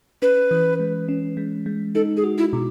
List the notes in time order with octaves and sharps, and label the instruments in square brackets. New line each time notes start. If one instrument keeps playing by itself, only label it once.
[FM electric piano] C#4 [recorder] B4
[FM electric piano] E3
G#3
C#4
G#3
G#3
[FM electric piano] D#4 [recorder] A4
[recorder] G#4
[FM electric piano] F#4
[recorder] E4
[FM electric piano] B2